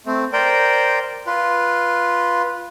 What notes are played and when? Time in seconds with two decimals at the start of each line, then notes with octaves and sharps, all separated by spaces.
0.06 A3 C4
0.33 A#4 C5 D5 G5
1.27 F4 B4